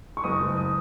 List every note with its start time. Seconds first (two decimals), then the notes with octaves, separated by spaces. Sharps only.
0.17 C#6
0.23 F#1 D#6
0.40 F#1
0.57 D#6